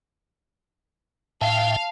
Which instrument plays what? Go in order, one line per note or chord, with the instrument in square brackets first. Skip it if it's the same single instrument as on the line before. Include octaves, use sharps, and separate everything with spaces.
[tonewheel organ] A2 E5 G5 [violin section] F5 [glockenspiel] A5